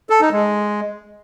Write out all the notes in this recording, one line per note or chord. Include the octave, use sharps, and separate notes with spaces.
A4
D#4
G#3